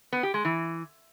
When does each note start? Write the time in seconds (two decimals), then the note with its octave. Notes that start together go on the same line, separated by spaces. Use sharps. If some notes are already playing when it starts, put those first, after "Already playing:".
0.13 B3
0.23 G4
0.34 G#3
0.45 E3